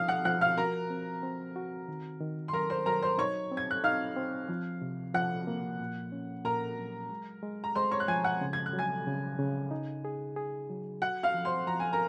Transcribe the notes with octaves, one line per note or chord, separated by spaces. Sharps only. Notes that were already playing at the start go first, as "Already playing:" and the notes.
Already playing: F3 D#4 F5 D#6 F6
F#5 F#6
F3 F#5 F#6
F5 F6
F#4 A#4 A#5
C4
C4
F#4
D#3
D#3
C6
F#3 A#4 A#5
C5 C6
F#3 A#4 A#5
C5 C6
D#4 C#5 C#6
C4
G#6
F#6
D#4 F5 F6
C4
F3
C3
F3 F#5 F#6
A#3
A#2
C#4
A#2 A#4 A#5
F#3
G#3
G#3
A#5
G#3 C5 C6
C#5 C#6
F#6
F3 G#5 G#6
F#5 F#6
C#3
G#6
F#6
F#3
G#5 G#6
C#3
C#3
D#4
G#4
G#4
F#3
F#4 F#5 F#6
F5 F6
F3
C5 C6
F3 A#5
G#5
A#4 A#5